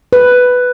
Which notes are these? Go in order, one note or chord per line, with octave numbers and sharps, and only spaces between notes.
B4